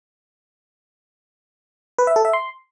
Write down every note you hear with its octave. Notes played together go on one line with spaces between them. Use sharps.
B4
E5
A4
E5
C6